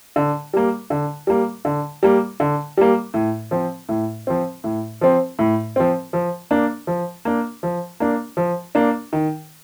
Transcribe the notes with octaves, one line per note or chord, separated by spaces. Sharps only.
D3
G3 A#3
D3
G3 A#3
D3
G3 A#3
D3
G3 A#3
A2
F3 C4
A2
F3 C4
A2
F3 C4
A2
F3 C4
F3
A#3 D4
F3
A#3 D4
F3
A#3 D4
F3
A#3 D4
D#3